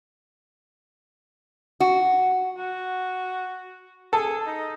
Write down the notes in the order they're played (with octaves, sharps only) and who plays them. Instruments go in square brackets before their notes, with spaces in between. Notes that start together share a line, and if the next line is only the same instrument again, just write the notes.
[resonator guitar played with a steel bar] F#4
[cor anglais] F#4
[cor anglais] G#4 [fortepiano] A4
[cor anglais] D#4